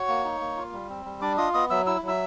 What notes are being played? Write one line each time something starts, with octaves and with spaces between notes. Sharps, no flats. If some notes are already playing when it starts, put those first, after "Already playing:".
Already playing: F#4 C#5 C#6
A#3
D#4
A#3
F4
G3
C4
G3
D4 D5 D6
F4 D#5 D#6
B3 D#5 D#6
F#3 E5 E6
E4 E6
F#3
E5 E6